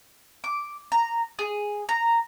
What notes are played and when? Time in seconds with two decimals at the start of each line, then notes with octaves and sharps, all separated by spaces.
0.44 D6
0.92 A#5
1.39 G#4
1.89 A#5